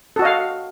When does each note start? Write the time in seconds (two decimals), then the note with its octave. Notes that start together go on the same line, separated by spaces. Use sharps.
0.16 A4
0.19 F#4
0.22 D#5
0.25 F5